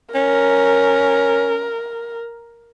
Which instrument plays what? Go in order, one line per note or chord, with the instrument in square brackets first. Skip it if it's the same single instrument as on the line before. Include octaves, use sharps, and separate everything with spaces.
[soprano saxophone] C#4 [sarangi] A#4